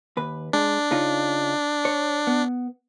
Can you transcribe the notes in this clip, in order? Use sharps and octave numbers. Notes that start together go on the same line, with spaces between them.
D#2 B4
G#3 D4
C#3 D#4 F4
C#5
B3